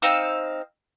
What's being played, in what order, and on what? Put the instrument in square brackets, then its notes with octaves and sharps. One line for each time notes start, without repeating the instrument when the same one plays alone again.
[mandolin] C4 D#4 F5 E6